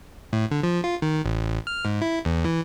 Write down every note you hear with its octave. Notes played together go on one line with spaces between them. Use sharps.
A2
D3
F3
F4
D#3
A1
F6
G#2
E4
E2
E3